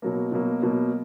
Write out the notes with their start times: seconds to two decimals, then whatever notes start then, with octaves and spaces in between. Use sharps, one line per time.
0.02 B2 F#3 A#3
0.32 B2 F#3 A#3
0.62 B2 F#3 A#3